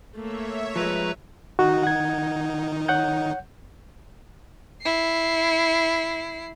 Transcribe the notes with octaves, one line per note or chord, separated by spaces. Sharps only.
A3 A#3 C#5 E5
F3 G#3 B4 A#5
D#3 D#4 F#4
F#5 G#6
C#5 F#5 G6
E4 C7